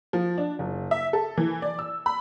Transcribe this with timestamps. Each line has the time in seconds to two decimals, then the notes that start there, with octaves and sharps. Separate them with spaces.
0.13 F3
0.38 D4
0.59 F#1
0.91 E5
1.13 A4
1.37 E3
1.62 D5
1.79 E6
2.06 B5